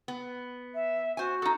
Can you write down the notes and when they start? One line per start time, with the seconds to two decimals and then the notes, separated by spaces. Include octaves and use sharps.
0.08 B3
0.74 E5
1.17 F#4 C5 G#5
1.42 D#4 A4